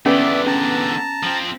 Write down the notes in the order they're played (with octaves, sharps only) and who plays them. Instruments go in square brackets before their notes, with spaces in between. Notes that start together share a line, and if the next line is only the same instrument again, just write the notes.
[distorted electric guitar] E2 D3 [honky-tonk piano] B3 [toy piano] C#4 F#5 [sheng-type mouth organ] D5 E5
[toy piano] C#4 [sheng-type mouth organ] A5 A#5
[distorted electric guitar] F3 C4